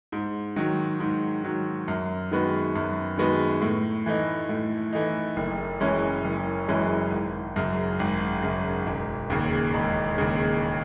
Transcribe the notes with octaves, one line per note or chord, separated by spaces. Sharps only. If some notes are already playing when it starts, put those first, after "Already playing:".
G#2
D#3 F#3
G#2
D#3 F#3
F#2
D#3 G#3 B3 F#4
F#2
D#3 G#3 B3 F#4
A2
E3 A3 D#4
A2
E3 A3 D#4
F#1
F#2 E3 G#3 C#4
F#1
F#2 E3 G#3 C#4
G#1
F#2 C#3
G#1
F#2 C#3
E1
D#2 C#3
E1
D#2 C#3